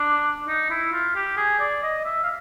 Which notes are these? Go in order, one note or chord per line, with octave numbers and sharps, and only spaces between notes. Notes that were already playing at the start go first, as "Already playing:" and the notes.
Already playing: D4
D#4
E4
F4
G4
G#4
D5
D#5
E5
F5